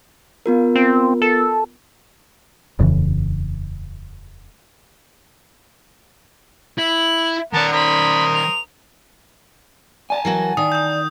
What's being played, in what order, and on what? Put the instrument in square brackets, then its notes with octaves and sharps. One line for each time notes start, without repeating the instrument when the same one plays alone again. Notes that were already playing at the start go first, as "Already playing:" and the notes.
[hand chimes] B3 F4 A#4
[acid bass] C4
A4
[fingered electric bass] D#1 F2 C#3 E3
[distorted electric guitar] E4 [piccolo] F#7
[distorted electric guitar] D#3 D5 [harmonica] B3 A#4 [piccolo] A5
[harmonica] A#4 C5 D#6 [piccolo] B5
[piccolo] F7
[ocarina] D5 [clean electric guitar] G#5 A5
[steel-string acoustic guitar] E3 F#3 F#4 [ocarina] A#4
[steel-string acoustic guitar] D#3 [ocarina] D5 [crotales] D#6
[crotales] D#6 G6